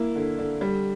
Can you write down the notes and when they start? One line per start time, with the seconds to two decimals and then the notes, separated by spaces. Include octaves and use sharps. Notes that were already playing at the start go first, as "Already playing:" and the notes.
Already playing: A#3 E4
0.15 D3
0.38 D3
0.61 G3